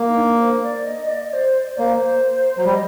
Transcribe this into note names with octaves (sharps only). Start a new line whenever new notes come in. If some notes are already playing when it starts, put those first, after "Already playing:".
Already playing: A#3
D#4
D4
C5
D5
D#5
D#5
D5
C5
D5
A#3 C5
F#3
G3
D#5